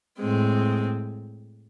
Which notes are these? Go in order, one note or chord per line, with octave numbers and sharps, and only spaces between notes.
A2 G#3 C4